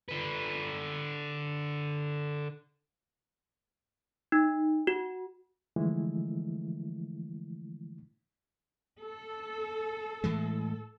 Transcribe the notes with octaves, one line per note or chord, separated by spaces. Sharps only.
D3 B4
D#4
F#4
D3 E3 F3 G#3 A3 E4
A4
A2 E3 G#3